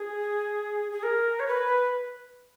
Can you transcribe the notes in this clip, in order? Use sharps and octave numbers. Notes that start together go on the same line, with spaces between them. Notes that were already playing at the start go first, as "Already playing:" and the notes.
Already playing: G#4
G#4
A#4
C#5
B4